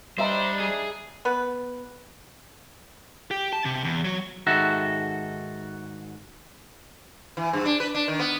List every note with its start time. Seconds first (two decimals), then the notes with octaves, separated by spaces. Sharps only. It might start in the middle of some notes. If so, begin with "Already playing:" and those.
0.18 G3 D4 D#4 C5 D#5 E5 A#5
0.60 G#4
1.25 B3 B4
3.31 G4
3.53 A5
3.65 C3
3.84 E2
4.04 F#3
4.47 G#2 D#3 F#4 A4 E5
7.37 E3
7.53 G2
7.66 D4
7.80 B4
7.95 D4
8.08 D#3
8.20 B3